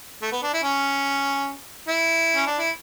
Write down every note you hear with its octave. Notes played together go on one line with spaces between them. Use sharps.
A3
B3
D4
E4
C#4
E4
C#4
D4
E4